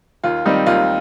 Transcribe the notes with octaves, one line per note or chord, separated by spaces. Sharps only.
D#2 F4
D#3 G3 C4 D#4
D#2 F4